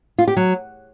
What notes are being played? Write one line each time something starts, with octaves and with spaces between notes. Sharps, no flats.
F4
G4
F#3